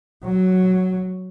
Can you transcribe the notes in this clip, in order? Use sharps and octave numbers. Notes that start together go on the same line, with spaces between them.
F#3